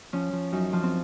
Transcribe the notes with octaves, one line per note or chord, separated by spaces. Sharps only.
F3 C#4
F3
F#2 D#4
F3 F4
C4